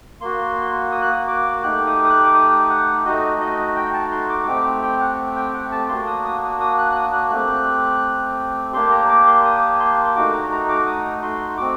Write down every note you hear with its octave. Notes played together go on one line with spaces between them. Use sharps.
A#3 F#4 C6
D#6
F#6
D#6
D6
A3 D#4 G4 F#6
D#6
D#6
F#6
D6
D#6
F#5
A3 D#4 F#4 D#5
D#5
G5
A5
C6
D6
A3 C4 G4 D6
G5
F#5
G5
F#5
A5
A#3 D4 F#4 C6
D#6
D#6
D#6
F#6
F#6
D#6
F#6
A3 C4 G4
A#3 D4 G4 C6
A#5
D6
C6
D#6
C6
A3 D#4 F#4 D6
A#5
A#5
D6
D#6
C6
C4 F#4 D6